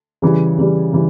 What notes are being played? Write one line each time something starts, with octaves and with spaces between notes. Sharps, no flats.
C#3 E3 G3
C#3 E3 G3
C#3 E3 G3